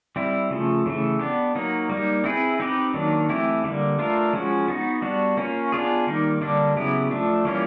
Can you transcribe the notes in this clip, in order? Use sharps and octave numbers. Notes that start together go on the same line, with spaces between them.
G3 C4 E4
C#3 F3 A3
C#3 E3 A3
B3 D4 G4
F#3 A#3 D#4
G3 A#3 D#4
C4 E4 G#4 B4
C4 D#4 G4 B4
D#3 F#3 A#3 D4
E3 A3 C4 E4 G4
D3 G3 A#3
A3 D4 F4 A#4
F3 G#3 C#4 F#4
B3 D#4 F#4
G3 B3 D4 F#4
A#3 C#4 F4
B3 D4 F4 G#4
D#3 G3 A#3 D#4
D3 G3 A#3 D4
C#3 F#3 B3 E4 G4
F3 A3 D4
E3 G3 A#3 C#4 F4